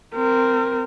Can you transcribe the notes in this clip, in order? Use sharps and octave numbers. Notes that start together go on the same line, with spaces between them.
C4 A#4